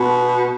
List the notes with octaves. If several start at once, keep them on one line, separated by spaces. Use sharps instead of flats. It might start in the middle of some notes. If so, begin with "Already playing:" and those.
Already playing: B2